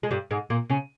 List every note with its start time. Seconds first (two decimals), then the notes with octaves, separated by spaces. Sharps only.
0.03 G#3
0.11 G2 G3
0.31 G#2 G#3
0.50 A#2 A#3
0.70 C#3 C#4